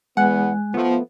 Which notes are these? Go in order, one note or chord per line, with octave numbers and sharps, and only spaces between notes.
E2 G#3 B3 F#5 G#5 F#6
F3 A3 B3